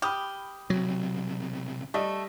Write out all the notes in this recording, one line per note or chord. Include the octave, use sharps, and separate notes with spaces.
G4 B5 D#6 F6
B1 C3 F#3
G3 A3 D#5 E5